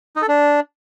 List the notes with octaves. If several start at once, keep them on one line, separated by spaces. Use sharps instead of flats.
D#4
A4
D4